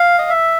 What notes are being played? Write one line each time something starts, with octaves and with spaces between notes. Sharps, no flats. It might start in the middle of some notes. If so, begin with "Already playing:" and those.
Already playing: F5
D#5
E5